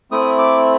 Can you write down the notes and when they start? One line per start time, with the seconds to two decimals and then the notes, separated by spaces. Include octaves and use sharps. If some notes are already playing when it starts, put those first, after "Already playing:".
0.11 A3 C4 E4 D#6
0.38 D6